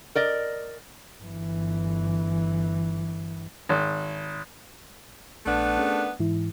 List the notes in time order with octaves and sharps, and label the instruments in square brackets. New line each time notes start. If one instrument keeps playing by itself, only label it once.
[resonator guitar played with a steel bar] A#4 D5 D#5
[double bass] G1 E3
[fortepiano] G#1
[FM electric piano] A#1 [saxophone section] A3 B3 D4
[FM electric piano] C#4 G#4 A#4
G#2 E3 E4